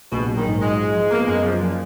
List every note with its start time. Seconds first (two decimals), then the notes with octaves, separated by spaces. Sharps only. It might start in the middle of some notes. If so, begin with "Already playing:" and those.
0.12 A#1 B2
0.28 F#3
0.37 D#3
0.45 G#2
0.61 G#3 F4
0.78 F4
0.94 F3
1.11 A#3 B3
1.27 F#2 G#3
1.44 F3 F#3
1.60 A#2 F3